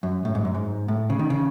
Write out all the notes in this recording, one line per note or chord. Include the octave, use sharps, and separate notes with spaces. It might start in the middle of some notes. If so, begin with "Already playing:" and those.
F#2
A2
G#2
F#2
G#2
A2
C#3
D#3
C#3